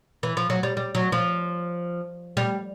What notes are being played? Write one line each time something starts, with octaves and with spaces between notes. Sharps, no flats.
E3
F3
F#3
G3
G3
F#3
F3
G3